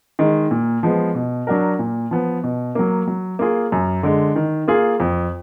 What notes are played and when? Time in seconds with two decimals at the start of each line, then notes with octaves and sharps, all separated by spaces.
0.19 D#3 G#3
0.51 A#2
0.83 F3 G#3 B3
1.15 B2
1.47 F#3 D4 F#4 A#4
1.79 A#2
2.11 F3 B3
2.44 B2
2.75 F#3 A#3
3.07 F#3
3.39 A#3 F4 G#4
3.72 F#2
4.03 D3 G#3
4.36 D#3
4.68 A#3 F4 G#4
5.00 F2